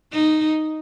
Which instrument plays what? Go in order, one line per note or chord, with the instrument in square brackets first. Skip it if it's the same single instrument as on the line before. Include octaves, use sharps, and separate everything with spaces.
[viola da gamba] D#4